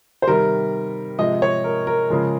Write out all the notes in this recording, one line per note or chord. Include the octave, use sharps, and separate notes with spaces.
C5
C3 D#3 G3 A#4
C3 F3 G#3 D#5
C#5
A#4
A#4
C#3 F3 G#3